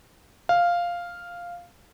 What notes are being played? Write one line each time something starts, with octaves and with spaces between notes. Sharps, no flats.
F5